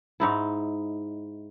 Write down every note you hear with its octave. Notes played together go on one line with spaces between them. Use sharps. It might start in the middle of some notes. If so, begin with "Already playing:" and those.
G#2 D#4 E4